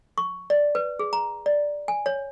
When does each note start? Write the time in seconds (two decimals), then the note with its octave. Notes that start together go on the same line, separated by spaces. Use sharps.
0.18 C#6
0.50 D5
0.75 B4
0.99 G#4
1.13 A#5
1.46 D5
1.88 G#5
2.06 C#5